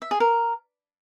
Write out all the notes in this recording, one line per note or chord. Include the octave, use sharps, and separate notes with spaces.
E5
G#4
A#4